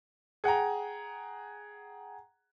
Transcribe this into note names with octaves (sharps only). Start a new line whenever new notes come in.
G#4 F#5 G5 A#5